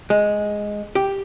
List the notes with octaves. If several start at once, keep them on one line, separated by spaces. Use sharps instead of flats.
G#3
G4